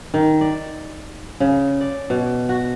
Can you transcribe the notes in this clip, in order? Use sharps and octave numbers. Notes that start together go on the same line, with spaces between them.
D#3
D5
C#3
D5
B2
F#4